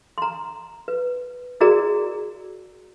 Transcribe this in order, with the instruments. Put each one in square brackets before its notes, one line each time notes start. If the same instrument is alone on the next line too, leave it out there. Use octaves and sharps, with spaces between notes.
[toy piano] A#5 C6
B4
E4 F#4 G#4 A#4 D5 A#5